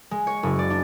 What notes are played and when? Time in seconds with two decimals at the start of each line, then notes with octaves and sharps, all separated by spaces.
0.11 G#3
0.27 C#5
0.43 F#1
0.59 D5
0.70 D4